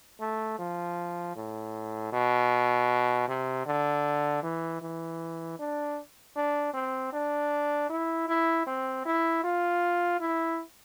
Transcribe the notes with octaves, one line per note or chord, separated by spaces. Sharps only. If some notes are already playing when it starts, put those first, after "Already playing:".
A3
F3
A2
B2
C3
D3
E3
E3
D4
D4
C4
D4
E4
E4
C4
E4
F4
E4